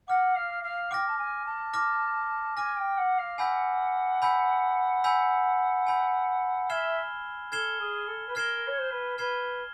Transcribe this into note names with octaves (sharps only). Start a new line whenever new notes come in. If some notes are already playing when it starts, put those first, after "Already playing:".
F#5 D6 F6 A#6
F5
F5
G5 D6 F6 A#6
A5
G#5
A5
D6 F6 A#6
G#5 D6 F6 A#6
G5
F#5
F5
F#5 G#5 B5 E6 G6 B6
G#5 B5 E6 G6 B6
G#5 B5 E6 G6 B6
G#5 B5 E6 G6 B6
E5 F6 G#6 C7 E7 G7
A4 F6 G#6 C7 E7 G7
G#4
A4
B4
A#4 F6 G#6 C7 E7 G7
C#5
C5
B4
B4 F6 G#6 C7 E7 G7